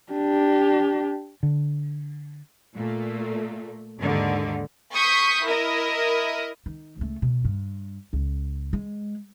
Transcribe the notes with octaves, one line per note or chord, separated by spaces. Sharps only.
D4 G4
D3
A#2 A3
D#2 G#2 D3 D#3
C#6 D#6 G6 B6 C7
E4 A#4 D#5
D#3
C#2 A3
B2
G2
C#2
G#3